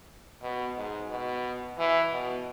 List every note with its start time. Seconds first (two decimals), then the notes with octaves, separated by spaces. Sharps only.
0.42 B2
0.76 G#2
1.09 B2
1.78 E3
2.11 B2